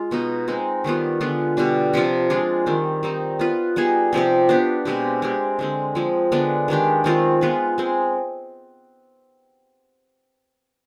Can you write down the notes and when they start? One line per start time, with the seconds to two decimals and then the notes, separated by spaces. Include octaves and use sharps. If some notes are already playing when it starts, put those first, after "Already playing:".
Already playing: G#3 F4
0.11 B2 B3 D#4
0.48 G#3 C4 D#4
0.84 D#3 G3 B3 F4
1.21 D3 G#3 B3 F4
1.57 B2 G3 D4
1.94 C3 F3 C4 F4
2.30 G#3 D4 F4
2.66 D#3 G3 C4
3.03 G3 C4 D#4
3.39 B3 F4 B4
3.76 G3 B3 D#4 G#4
4.13 C3 F3 C4 G4
4.49 B3 D4 G4
4.85 B2 G#3 C4 G4
5.22 G#3 C4 G4
5.59 D3 G#3 C4
5.95 F3 G#3 C4
6.32 D3 G#3 B3 D4
6.68 D#3 G#3 D4 G4
7.04 D#3 G#3 C4 F4
7.41 G#3 B3 F4 B4
7.78 G#3 C4